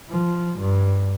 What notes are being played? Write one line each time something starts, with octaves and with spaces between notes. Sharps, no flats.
F3
G2